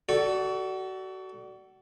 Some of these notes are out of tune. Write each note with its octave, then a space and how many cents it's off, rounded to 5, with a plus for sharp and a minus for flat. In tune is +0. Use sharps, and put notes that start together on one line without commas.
F#4 +30 A4 +0 D5 +0